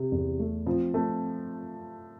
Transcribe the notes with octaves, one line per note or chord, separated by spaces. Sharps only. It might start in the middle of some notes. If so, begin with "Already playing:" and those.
Already playing: C3
E2
A3
F3 C4
A3 C4